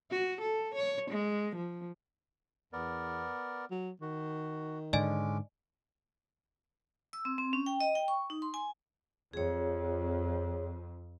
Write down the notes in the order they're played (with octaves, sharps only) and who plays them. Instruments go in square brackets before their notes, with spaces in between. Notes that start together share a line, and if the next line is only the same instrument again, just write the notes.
[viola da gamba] F#4
A4
C#5
G#3
F3
[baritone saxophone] E2 [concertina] B3 A#4 D5
[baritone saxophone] F#3
[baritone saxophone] D#3 [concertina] F#4
[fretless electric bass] G#2 D3 [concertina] G#3 C#4 D6 [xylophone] D5 D#5 G#5
[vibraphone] E6
C4
C4
C#4
G5
D#5
G5
C#6
D#4
C6
G#5
[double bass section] F2 [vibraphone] G#4 C#5